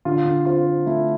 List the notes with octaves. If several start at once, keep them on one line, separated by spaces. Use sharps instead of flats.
D3 F4
D3
C4 F4
C4
A3 E4